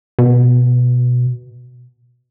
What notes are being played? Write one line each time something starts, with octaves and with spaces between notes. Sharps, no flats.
B2